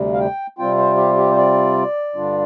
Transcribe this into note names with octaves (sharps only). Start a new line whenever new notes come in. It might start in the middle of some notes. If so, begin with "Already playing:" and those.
Already playing: D2 C3 G3
F5
G5
C3 G3 C4 F4 G5
C5
G4
G4
C5
D5
G2 D3 G3 D4 F4